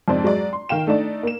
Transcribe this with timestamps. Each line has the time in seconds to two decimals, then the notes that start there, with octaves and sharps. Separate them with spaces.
0.08 F2 G#2 C4 D5
0.24 F#3 G#3 D5
0.53 C6
0.69 D#3 F5 G5 E7
0.87 A3 D4 D#4 D5
1.23 A#3 E7